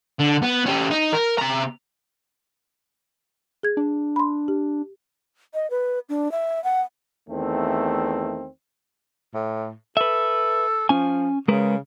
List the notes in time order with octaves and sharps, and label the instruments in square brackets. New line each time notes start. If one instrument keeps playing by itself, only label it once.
[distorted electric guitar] D3
B3
C#4 G4
D#4
A#4
C3 A#5
[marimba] G#4 G#6
[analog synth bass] D4
[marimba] B5 C6
G4
[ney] D#5
B4
D4
E5
F#5
[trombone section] E2 D#3 A3 C4
[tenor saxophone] A2
[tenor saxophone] A4 [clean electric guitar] B4 E5
[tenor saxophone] F3 [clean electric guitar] C#4 G#5
[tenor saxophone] C#3 [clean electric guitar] G#3 A#4 B4